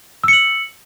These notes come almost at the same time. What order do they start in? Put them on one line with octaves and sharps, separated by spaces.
E6 C#7 F#7